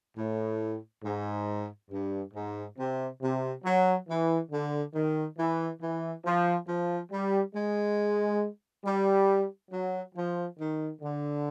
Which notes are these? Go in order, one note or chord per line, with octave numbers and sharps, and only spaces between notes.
A2
G#2
G2
G#2
C3
C3
F#3
E3
D3
D#3
E3
E3
F3
F3
G3
G#3
G3
F#3
F3
D#3
D3